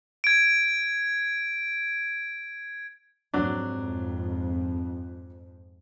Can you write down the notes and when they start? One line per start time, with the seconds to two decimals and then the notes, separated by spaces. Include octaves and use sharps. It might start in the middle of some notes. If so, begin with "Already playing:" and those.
0.24 G#6 D7
3.34 F2 G#2 F#3 D4